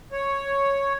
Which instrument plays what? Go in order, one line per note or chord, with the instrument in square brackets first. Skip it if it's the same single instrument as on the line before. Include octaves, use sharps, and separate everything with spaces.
[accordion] C#5